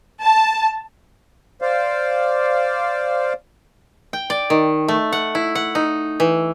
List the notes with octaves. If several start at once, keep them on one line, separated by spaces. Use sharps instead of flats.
A5
C5 D5 F5
G5
D5
D#3
A3
F#5
E4
F#5
D#4
E3